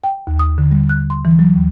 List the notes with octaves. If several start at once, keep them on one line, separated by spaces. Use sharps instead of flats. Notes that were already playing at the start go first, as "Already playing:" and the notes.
G5
D#2
D#6
D3
G3
F#6
C6
E3
F#3
D#2